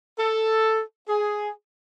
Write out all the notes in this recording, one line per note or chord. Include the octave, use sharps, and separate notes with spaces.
A4
G#4